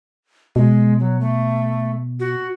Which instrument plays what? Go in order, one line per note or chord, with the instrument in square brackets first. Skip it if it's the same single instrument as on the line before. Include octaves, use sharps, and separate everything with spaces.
[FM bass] B2 [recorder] G#3
[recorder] F#3
A3
F#4